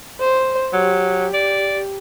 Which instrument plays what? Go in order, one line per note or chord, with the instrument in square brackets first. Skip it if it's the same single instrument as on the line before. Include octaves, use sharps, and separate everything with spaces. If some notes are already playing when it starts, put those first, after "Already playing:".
[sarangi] C5
[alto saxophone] F#3 [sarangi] G4
[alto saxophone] D5